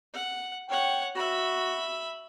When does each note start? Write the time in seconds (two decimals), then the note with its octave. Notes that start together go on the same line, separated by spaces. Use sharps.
0.13 F#5
0.69 C#5 F#5 G5
1.15 F#4 E5 B5